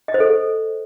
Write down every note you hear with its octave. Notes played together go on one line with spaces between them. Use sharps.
D#5
C5
A4